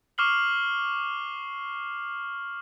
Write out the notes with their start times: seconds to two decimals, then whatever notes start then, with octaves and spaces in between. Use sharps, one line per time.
0.18 C#6 D6 F6 C7 F#7